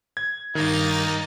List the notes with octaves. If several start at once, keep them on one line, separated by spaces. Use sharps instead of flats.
G#6
G2 D#3 A#3 D#4 A6